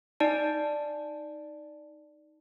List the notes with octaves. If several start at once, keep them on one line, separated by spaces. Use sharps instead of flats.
D#4 D5 A5